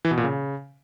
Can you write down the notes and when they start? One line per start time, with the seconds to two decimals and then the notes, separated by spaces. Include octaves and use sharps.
0.05 E3
0.11 B2
0.17 A#2
0.24 C#3